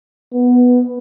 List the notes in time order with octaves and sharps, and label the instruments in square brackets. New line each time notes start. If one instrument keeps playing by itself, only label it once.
[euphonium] B3